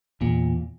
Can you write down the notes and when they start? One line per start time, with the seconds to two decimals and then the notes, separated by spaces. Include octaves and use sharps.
0.21 E2 A#2